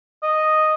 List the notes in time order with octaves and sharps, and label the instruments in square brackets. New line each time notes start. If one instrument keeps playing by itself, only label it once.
[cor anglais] D#5